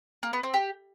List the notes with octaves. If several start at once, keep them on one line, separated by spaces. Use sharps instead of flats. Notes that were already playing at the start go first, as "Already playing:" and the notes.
A#3
B3
C4
G4